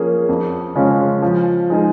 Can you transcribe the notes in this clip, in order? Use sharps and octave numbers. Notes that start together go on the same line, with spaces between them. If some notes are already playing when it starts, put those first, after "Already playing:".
Already playing: F3 A#3 C#4 G#4
F2
C#3 G#3 C#4 F4
F3
G#3 D#4 G#4